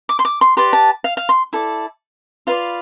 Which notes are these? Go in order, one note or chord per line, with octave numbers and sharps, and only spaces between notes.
D6
C6
D6
C6
G4 B4 D5 C6
A5
F5
F5
C6
E4 A4 D5
F4 B4 D5 F5